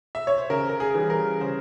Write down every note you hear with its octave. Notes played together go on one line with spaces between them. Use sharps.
E5
C#5
C5
C#3 A#4
A#4
G#4
E3 G3
A#4
C#3 C5